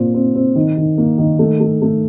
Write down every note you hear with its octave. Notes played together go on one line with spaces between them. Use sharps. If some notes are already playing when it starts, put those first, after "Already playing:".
Already playing: A#2 C4
C4
C4
D#3
D#3
A#3
D#3
A3
A3
A3